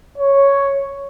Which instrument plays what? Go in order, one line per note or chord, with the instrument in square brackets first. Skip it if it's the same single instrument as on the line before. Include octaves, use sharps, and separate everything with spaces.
[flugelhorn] C#5